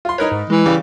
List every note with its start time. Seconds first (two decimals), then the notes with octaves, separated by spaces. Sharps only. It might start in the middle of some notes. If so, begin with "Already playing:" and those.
0.05 F4 C6
0.18 D#4 A#4 B4 C#5
0.31 G#2
0.50 E3 G#3
0.66 C#3 G3 D6